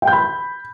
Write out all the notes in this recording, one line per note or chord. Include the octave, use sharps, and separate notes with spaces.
G5
G6
B5